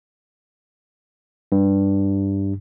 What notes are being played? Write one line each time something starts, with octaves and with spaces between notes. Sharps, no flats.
G2